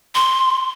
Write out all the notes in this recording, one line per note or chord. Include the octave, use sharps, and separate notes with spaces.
C6